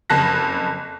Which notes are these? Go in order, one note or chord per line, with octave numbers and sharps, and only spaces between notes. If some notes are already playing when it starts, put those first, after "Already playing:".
F#1 F2 A5 F#6 A#6